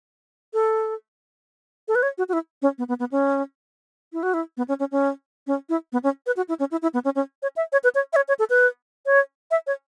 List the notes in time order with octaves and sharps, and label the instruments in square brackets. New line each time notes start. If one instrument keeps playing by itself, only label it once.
[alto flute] A4
A4
B4
C#5
F#4
F#4
E4
C#4
B3
B3
B3
C#4
E4
F#4
E4
B3
C#4
C#4
C#4
C#4
E4
B3
C#4
B4
F#4
E4
C#4
E4
E4
B3
C#4
C#4
C#5
E5
C#5
B4
C#5
E5
C#5
C#5
A4
B4
C#5
E5
C#5